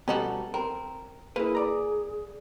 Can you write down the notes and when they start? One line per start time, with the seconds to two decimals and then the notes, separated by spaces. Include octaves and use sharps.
0.08 B2 G3 C#4 D#4 F#4 A4
0.54 C4 A#4
1.36 A#3 E4 G#4 B4
1.55 D5 A#5